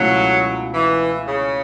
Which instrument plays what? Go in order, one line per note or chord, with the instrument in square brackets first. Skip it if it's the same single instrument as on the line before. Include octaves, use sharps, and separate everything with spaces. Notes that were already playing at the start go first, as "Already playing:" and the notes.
Already playing: [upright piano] C#2 B2 A3 E4 [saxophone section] F#3
[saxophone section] E3
C#3